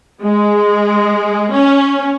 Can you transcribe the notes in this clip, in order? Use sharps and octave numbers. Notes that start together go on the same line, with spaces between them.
G#3
C#4